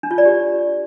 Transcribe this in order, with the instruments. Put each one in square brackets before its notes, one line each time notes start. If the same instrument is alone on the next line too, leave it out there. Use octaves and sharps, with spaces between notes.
[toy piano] D4
F4
D5
G4